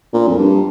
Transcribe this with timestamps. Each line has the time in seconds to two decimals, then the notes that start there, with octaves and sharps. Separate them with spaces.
0.13 A#2
0.27 F2
0.38 G2